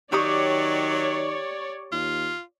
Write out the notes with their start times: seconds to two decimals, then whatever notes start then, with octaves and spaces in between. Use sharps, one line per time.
0.12 D#3 F#3 G4 C#5 D5 C#6 D#6
1.92 D#2 F4